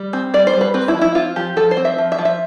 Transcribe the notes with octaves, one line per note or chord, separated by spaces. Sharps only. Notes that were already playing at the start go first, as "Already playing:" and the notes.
Already playing: G3
C4
G3 D5
C5
G3
B4
C4 B4
E4
F3
E4
C4 F4
F3 G4
F3 A4
C5
C4
E5
F3
E5
F3
E5